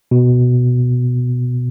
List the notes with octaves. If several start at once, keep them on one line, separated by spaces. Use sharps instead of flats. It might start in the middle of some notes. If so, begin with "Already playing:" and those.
B2